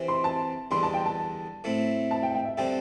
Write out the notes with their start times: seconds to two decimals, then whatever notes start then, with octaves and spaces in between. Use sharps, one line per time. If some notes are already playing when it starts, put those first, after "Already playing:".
Already playing: C3 E3 C4
0.08 C6
0.24 A5
0.71 E2 D3 G3 C6
0.83 A5
0.94 G5
1.06 A5
1.64 A2 A3 C4 E4
2.11 A5
2.23 G5
2.34 G5
2.45 E5
2.57 D3 G3 C4 A4 G5